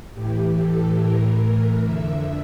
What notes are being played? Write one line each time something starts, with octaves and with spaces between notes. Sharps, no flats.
A2 E3 G4
A4
A2 E3 A#4
A#4
F2 D3 E5